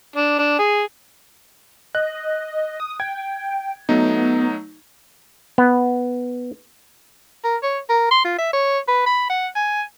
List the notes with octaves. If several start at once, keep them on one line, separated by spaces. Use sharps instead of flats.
D4
D4
G#4
D#5 F#6
D#6
G5 G#6
F#3 A3 B3 D#4
B3
A#4
C#5
A#4
C6
F4
E5
C#5
B4
B5
F#5
G#5